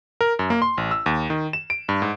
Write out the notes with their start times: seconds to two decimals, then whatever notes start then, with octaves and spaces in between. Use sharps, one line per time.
0.21 A#4
0.39 F#2
0.50 A#3
0.62 C6
0.78 A1
0.91 E6
1.06 D#2
1.30 D#3
1.53 E7
1.70 D7
1.89 G2
2.02 G#2